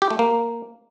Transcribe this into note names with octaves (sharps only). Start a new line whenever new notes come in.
G4
A3
A#3